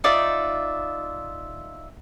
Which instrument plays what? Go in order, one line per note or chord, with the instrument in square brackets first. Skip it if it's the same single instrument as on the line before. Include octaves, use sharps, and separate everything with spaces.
[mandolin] D#4 F4 D5 E5